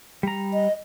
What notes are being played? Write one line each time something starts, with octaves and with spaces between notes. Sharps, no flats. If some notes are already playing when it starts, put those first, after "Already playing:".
G3 A#5
D#5